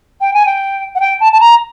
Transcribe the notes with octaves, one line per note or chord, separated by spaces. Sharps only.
G5
G#5
G5
F#5
G5
A5
A5
A#5